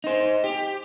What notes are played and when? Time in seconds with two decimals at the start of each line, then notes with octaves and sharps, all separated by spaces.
0.04 D#4 C5
0.44 G4